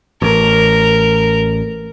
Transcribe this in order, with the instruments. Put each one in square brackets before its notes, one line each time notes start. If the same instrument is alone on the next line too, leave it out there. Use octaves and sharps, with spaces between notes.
[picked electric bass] A1 [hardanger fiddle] A#4